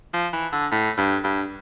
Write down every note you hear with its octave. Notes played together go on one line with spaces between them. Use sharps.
F3
E3
D3
A2
G2
G2